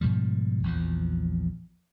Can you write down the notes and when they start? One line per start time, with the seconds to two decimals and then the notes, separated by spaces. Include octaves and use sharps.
0.01 G#2 B2 F3 G3
0.63 A#1 E2 F3